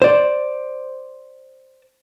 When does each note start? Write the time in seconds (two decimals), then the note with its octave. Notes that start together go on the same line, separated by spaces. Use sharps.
0.02 C5 D5